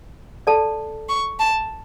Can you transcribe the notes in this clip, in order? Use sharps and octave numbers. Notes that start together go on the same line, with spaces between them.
A4 D5 A5
C#6
A5